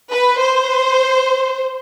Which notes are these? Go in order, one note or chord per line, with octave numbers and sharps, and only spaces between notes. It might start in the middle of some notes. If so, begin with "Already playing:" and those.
B4
C5